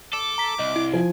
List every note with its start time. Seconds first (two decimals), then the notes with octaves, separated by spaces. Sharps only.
0.13 A4 D6
0.38 A#5 B6
0.59 C2 D#5
0.76 E4
0.93 F3 G#5